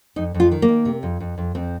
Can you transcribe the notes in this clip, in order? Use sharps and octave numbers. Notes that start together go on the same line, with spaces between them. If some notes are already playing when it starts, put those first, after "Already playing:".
F2 D#4
F2
F4
D#3
A#3
D#3
C3
F2
F2
F2
F2 C4